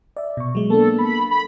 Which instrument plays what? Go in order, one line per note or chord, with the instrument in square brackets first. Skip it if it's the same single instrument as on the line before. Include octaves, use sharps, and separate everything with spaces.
[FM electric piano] D5 E5
B2 C#6
F#3 G#3
[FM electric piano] A#3 B3 D4 [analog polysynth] A4
[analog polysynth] B5
B5